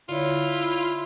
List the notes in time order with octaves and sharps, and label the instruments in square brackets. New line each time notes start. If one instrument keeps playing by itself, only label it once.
[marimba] D3 C#5 [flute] E4 [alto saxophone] F4